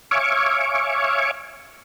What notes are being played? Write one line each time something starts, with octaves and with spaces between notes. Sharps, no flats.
C#5 E5 F5 G#5 C#6 D6